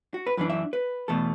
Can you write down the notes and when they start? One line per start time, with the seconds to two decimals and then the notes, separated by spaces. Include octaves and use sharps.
0.14 F#4
0.27 B4
0.37 F#2 E3 D4 B4
0.50 E5
0.73 B4
1.08 E2 B2 A3 A4